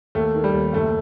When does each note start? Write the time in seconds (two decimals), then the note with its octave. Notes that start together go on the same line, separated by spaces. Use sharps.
0.15 D#2 A3
0.34 D#3
0.44 G3
0.54 D#2
0.73 F#1 A3